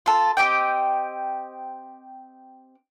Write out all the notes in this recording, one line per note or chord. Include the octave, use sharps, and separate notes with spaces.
F4 A4
C4 G4 D#5 G5